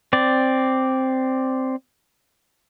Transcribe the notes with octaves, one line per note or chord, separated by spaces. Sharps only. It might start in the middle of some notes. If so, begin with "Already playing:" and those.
C4 D5